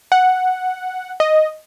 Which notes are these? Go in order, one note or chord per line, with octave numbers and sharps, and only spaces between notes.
F#5
D#5